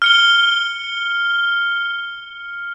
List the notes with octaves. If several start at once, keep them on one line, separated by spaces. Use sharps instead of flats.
F6 C#7 G7